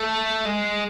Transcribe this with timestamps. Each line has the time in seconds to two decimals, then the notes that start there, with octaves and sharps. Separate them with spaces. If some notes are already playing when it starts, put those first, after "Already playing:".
Already playing: A3
0.46 G#3